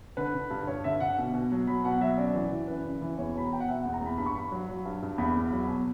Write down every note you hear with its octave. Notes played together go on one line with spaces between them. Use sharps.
D3 B4
D3
G2
G2 C#5
D3 E5
D3 F#5
B2
B2
F#3
F#3 B5
B2 F#5
F#3 E5
F#2 D5
E3
E3
F#2 B4
C#3
E3
E2 C#5
B2 B5
A#5
B2 G5
F#5
B2 E5
E2 F#5
A#5
E2 B5
G2 B5
C#6
G2 B5
F#3
F#3
G2
G2
E2 B5
E2
F#3
B2